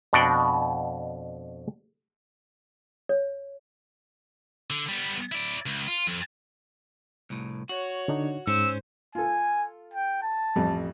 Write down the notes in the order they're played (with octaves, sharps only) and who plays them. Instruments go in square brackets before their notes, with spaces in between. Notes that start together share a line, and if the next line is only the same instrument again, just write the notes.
[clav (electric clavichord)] F2 B2 D4 F#4 D5 G5
[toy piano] C#5
[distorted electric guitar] D3
G3 B3
E4 D5
C#2
F4
F2
[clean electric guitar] C2 A2
[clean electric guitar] F#4 [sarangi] C#5
[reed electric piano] D3 D4 D#4
[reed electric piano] G#2 [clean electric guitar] C#4 [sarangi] C5 [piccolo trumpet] E6
[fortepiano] F4 A4 [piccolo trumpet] G#5
[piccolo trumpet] G5
A5
[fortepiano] A1 F2 G3